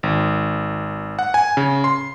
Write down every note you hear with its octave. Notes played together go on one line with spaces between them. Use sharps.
G#1
F#5
G#5
C#3
C6